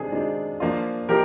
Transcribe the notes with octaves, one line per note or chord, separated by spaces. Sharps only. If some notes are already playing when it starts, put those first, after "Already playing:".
Already playing: C3 D#3 G#3 D4 G#4
C3 D#3 G#3 D4
F3 A#3 D4 F4
F3 G4 A#4